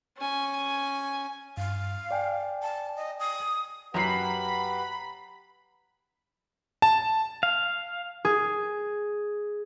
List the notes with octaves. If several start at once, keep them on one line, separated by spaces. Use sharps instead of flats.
C#4 G#5
G2 F5
D5 G5 G#5
A5
D#5
D#6
F#2 F#3 G4 B4 F#5 A#5 B5 C7
A5
F5
G#4